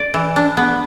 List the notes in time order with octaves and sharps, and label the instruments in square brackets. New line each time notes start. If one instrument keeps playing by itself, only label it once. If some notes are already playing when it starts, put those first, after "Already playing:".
Already playing: [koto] D5
E3
D4
B3